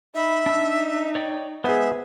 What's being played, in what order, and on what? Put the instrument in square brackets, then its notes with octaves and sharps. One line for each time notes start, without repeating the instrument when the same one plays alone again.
[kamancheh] D#4 B5 [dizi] E5
[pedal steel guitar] D4 E6 [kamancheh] D#4
[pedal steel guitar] C#5 D5 G5
[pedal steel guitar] G#3 C5 G#5 [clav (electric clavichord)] B3 G#4 [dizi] E5